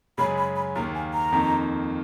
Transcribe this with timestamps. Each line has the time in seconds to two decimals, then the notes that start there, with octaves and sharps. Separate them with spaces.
0.18 F#2 C#3 G#3 C#4 G#4 B5
0.38 B5
0.56 B5
0.75 D#2 D#3 A#3 A#5
0.95 G#5
1.14 A#5
1.32 F2 D#3 A#3 D#4